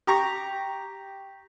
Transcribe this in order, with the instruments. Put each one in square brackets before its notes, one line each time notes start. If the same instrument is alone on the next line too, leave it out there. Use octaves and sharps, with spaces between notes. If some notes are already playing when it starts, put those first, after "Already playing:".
[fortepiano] G4 A#5 C#6